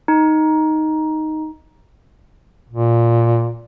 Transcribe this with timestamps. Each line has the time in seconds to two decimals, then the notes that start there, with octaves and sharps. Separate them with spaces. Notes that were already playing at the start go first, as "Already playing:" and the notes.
0.08 D#4
2.70 A#2